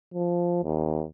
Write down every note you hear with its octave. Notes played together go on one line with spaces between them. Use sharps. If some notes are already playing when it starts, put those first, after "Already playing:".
F3
D#2